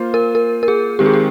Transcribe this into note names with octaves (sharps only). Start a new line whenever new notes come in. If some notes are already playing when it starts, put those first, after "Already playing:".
Already playing: A#3 F4 C5
A#4
A#4
A#4
G#4
D#3 G#3 C4 G4
G#4
G4